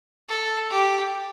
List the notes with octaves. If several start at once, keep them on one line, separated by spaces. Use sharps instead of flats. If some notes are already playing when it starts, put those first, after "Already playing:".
A4
G4